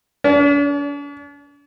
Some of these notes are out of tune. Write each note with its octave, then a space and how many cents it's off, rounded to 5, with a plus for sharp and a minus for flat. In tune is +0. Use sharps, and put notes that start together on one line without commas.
D4 -45